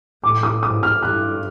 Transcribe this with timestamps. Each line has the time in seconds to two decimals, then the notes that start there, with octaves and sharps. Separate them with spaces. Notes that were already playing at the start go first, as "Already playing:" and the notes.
0.23 A2 D6
0.43 D#6
0.63 G#2 D#6
0.83 F6
1.03 G2 F#6